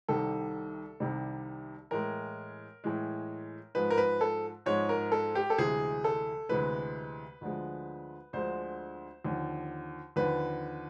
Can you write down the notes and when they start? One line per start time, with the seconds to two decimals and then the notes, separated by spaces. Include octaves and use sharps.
0.08 C2 C3 D#3 G3 A4
1.00 C2 C3 D#3 G3
1.91 A2 E3 G#3 A#4
2.84 A2 E3 G#3
3.75 G#2 F3 G#3 B4
3.91 A#4
3.97 B4
4.21 A4
4.66 G#2 F3 G#3 C#5
4.89 A#4
5.12 A4
5.35 G4
5.50 A4
5.58 D2 C3 E3 G#3 G#4
6.04 A4
6.49 D2 C3 E3 G#3 B4
7.41 D2 D3 F3 G#3
8.33 D2 D3 F3 G#3 C5
9.25 D#2 D3 F3
10.16 D#2 D3 F3 B4